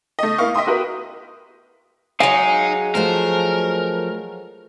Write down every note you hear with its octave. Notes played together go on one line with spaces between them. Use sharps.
A3 D#5
A#3 E4 F5 C#6
D#5 E5 G5 C6 D#6
F#4 G4 A#4 B4 E5
F#3 G#3 D#4 F5 G#5
F3 A3 A#4 C5